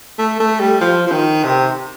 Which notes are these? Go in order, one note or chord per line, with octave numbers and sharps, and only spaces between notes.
A3
A3
G3
F3
F3
D#3
C3